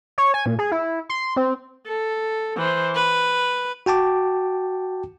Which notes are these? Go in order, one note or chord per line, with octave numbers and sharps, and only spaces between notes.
C#5
G#5
A#2
G#4
E4
C6
C4
A4
E3 C5
B4
F#4 G5 A5 D6